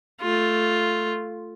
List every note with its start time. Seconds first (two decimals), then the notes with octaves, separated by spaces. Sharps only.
0.21 A3 F4